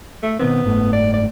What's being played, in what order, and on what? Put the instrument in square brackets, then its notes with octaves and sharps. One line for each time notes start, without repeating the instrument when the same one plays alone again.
[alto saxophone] A3
[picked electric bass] B2 D#3 C4 [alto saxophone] B3
[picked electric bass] F#1 G#2 A3
[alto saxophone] D5
D5